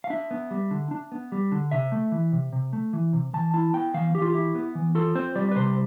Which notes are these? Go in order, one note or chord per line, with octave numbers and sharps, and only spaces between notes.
F5
D4 E5
B3
G3
D3
D4
B3
G3
D3
C3 E5
A3
E3
C3
C3
A3
E3
C3
E3 A5
E4 A5
B3 G5
E3 F5
E3 G4
F4
E4 G4
B3
E3
F4 A4
C4 C5
G3 D5
B4
C3 C5